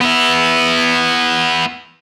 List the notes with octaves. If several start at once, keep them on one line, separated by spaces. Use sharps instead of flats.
B3 E4